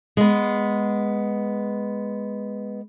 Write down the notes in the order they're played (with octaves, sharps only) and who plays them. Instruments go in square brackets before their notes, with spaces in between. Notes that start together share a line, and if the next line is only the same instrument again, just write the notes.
[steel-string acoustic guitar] G#3 B3